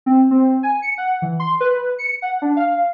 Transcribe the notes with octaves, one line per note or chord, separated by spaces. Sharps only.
C4
C4
G#5
C#7
F#5
E3
C6
B4
C#7
F#5
D4
F5